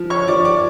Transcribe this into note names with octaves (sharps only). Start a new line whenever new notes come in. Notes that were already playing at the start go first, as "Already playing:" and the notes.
Already playing: F3
C#5 C#6
F3 D5 D6
D5 D6